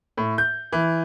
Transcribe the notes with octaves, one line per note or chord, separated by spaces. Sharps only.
A2
G6
E3